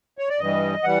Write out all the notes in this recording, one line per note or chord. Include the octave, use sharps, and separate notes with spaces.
C#5
D5
G2 E3 G3 D#5
E3 G3 F#5